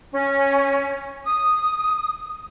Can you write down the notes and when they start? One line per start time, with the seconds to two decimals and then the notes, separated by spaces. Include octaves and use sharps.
0.11 C#4
1.24 D#6